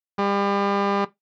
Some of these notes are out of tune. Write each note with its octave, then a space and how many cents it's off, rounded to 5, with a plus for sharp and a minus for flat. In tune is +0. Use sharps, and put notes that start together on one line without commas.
G3 +35